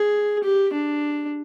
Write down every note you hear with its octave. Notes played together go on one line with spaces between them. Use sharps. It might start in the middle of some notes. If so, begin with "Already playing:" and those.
Already playing: G#4
G4
D4